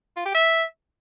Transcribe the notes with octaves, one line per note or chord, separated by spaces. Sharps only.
F4
G4
E5